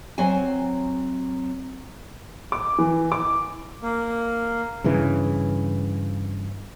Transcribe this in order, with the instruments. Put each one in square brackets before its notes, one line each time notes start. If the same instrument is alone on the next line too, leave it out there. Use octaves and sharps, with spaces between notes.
[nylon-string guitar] F#3 C4 G#5
[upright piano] D6
E3
D6
[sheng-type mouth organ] A#3
[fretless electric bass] G2 C#3 E3